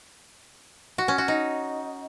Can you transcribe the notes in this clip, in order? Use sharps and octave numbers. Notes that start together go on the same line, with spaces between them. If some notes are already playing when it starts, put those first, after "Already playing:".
F#4
C#4
F#4
D#4